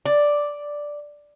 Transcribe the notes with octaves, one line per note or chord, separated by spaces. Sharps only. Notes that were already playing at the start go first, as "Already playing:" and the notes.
D5